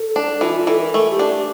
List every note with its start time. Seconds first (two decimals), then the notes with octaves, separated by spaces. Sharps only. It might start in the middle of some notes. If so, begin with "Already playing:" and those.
Already playing: A4
0.16 D4
0.41 E3 F4
0.54 F4
0.67 E3 A4
0.81 A#4
0.94 A3 A4
1.11 G4
1.19 D4
1.29 G4